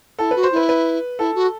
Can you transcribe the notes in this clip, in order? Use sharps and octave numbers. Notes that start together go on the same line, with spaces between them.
E4 A4
F#4 B4
C5
E4 B4
B4
E4 A4
F#4